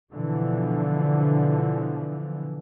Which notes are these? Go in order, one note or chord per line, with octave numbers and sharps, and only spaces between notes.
B2 D3 E3 F3